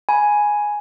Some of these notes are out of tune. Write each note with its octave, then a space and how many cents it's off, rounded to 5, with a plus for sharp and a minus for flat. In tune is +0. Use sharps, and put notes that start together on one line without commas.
G#5 +5 B5 -20